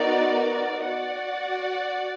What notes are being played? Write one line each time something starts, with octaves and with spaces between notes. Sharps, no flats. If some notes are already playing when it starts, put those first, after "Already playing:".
Already playing: B3 D#4 F#4 A#4 D5
F#4 D5 F#5